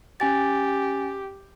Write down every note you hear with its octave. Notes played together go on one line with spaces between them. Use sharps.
C#4 G4 G#5 A6